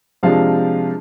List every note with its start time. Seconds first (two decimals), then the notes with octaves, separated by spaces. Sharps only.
0.23 C3 F3 G#3 D4 F4 F5